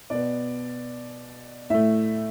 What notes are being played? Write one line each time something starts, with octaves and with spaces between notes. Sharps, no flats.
B2 B3 D5
A2 A3 E5